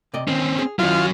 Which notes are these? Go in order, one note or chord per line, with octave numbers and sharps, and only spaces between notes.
C3 D5 D#5
D#3 C4 C#4
G#4
D#3 F#3 C#4 E4 F4